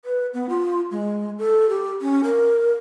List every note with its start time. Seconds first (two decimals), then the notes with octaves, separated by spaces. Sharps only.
0.05 B4
0.34 B3
0.49 F4
0.91 G#3
1.38 A4
1.69 G4
2.01 C#4
2.24 A#4